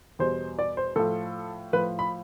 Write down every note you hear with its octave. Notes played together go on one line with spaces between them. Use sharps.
E2 B2 G3 C5
D5
C5
A2 F3 A4
A2 F3 B4
B5